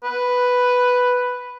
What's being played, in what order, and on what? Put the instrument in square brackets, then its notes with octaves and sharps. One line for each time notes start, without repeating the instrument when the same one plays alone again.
[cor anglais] B4